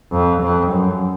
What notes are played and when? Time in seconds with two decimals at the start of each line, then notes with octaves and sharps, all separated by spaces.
0.12 F2
0.42 F2
0.72 F#2